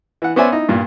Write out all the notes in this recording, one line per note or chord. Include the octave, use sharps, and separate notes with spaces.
E3 F#5
B3 C#4 C5 D5 E5 G#5
D#4 E4
G2 A#2